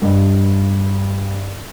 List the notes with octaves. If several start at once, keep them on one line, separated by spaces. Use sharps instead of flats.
G2 D#5